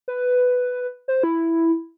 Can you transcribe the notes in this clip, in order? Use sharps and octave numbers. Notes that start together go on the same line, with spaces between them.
B4
C5
E4